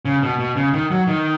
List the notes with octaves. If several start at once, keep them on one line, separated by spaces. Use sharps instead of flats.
C#3
B2
B2
C#3
D#3
F#3
D#3